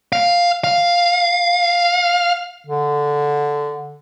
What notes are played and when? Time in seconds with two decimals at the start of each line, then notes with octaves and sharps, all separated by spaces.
0.13 F5
0.64 F5
2.67 D3